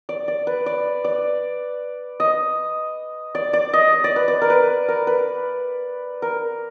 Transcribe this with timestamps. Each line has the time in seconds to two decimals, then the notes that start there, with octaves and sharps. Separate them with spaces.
0.09 D5
0.28 D5
0.47 B4
0.66 D5
1.04 D5
2.20 D#5
3.35 D5
3.53 D5
3.73 D#5
3.93 D#5
4.04 D5
4.16 B4
4.28 D5
4.42 A#4
4.50 B4
4.88 A#4
5.07 B4
6.22 A#4